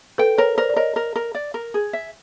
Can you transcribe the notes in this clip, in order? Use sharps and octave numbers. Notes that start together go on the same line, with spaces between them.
A4 B4 G5
A#4 B4 C#5
A#4 C5 D5
D5
A#4 C#5 D#5
A#4
A#4
D5
A#4
G#4
E5